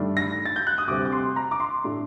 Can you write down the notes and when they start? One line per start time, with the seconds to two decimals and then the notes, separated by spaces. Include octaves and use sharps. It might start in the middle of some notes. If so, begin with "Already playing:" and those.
Already playing: G2 D#3 A3 D4
0.17 A#6
0.45 A6
0.56 G6
0.67 F#6
0.78 D#6
0.88 D2 C3 G3 C4 D6
1.05 D6
1.12 C6
1.36 A#5
1.51 D6
1.60 C6
1.84 A2 A3 D4